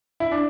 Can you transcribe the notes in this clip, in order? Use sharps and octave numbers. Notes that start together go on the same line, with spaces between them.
E4
D4